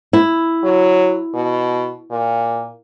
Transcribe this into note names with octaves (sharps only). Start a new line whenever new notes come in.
E4
F#3
B2
A#2